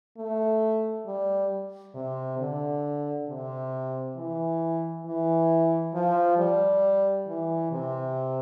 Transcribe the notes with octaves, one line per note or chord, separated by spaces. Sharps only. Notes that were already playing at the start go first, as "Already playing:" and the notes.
A3
G3
C3
D3
C3
E3
E3
F3
G3
E3
C3